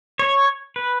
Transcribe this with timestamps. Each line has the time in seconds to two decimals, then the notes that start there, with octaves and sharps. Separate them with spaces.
0.19 C#5
0.76 B4